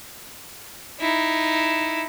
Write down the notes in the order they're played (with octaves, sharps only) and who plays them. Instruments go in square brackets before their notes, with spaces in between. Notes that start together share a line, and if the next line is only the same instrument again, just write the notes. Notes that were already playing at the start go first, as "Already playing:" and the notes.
[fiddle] D#4 E4